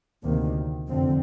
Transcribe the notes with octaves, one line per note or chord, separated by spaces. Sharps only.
D2 C3 D#3 A#3
F1 F2 D3 F3 C4